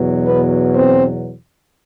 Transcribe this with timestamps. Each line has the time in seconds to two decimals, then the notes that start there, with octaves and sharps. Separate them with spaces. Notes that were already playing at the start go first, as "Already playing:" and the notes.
Already playing: E2 B2 F#3
0.25 B3 B4
0.74 C4 C5